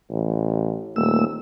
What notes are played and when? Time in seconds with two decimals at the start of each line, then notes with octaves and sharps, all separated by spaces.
0.10 A1
0.96 D#1 A3 A#3 E6